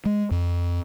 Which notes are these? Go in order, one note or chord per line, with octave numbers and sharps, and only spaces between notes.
G#3
F2